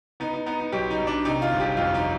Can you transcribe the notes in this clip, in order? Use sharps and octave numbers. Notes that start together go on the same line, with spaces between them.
B3 D#4
D#4
B3 D#4
D#4
B1 G4
D#4
B1
D4
C3 D#4
F4
G1
G4
F2 F4
D#4